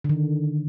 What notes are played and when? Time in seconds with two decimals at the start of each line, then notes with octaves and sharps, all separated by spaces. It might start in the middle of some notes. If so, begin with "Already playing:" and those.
0.04 D3
0.09 D#3